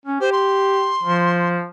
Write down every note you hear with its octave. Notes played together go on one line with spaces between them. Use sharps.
C#4
G4 C5
C6
F3